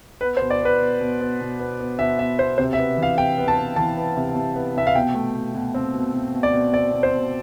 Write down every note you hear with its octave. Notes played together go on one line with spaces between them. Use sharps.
B3 B4
C5
B2
D5
B3 B4
B2
B2
B3
B2
B3
B3
B2 E5
B2 E5
B2 C5
C3 C5
E5
B3
E3
F5
C3 G5
B3
A5
B3
E3 A5
B3
C3
C3
B3
C3 E5
F5
B2 G5
A3
B2
B2
C4
B2
B2
B2
D5
B2
C4 D5
B2
C5
B2